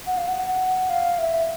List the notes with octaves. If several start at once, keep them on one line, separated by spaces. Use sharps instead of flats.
F#5
F5
F#5
F5
E5